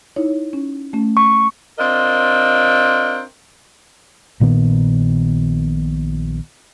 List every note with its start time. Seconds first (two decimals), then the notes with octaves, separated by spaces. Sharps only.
0.16 D#4 E4 C#5
0.53 C#4
0.93 A3 C#4
1.17 C#6
1.79 C4 D4 F4 A#4 D#5
4.40 A#1 A#2 D#3 B3